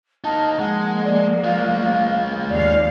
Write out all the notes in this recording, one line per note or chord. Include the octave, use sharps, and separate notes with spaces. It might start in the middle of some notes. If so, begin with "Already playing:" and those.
A#3 D#4 A5
F3 G#3 A#3 F#5
D5
G#3 F4 F5
D#2 D5 F5